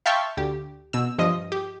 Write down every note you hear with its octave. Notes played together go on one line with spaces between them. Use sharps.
E5 F5 G5 A5 C6 C#6
D2 G4
B2 E6
G2 F3 D#5
G4